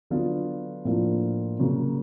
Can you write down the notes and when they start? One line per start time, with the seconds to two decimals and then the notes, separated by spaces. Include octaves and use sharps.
0.10 D3 F#3 B3 D4 F4
0.85 A2 F3 A#3 D4 F4
1.59 C#3 F#3 A#3